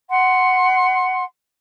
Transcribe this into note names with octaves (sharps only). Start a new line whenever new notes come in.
F#5 C6